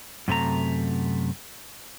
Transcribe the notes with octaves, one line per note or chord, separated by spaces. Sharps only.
F#2 C3 A3 A#5